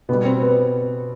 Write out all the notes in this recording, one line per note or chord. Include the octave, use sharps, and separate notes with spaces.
B2 G3 B3
C4
B3